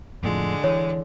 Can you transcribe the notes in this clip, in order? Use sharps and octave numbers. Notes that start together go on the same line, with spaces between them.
F2 A2 D3 F3 G#3
E3 C#5